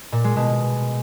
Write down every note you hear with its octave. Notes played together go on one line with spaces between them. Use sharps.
A#2
G#3
B2